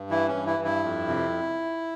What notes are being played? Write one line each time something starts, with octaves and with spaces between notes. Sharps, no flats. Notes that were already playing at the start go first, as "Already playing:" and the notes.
Already playing: G2
E3 E4
C#4
G2
E4
G2
E4
F2
C3